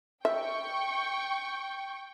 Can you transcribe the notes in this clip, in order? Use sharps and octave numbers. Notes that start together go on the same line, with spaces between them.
E5 G5 C#6